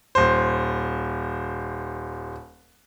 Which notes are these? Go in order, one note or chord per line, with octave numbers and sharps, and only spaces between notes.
D#1 C5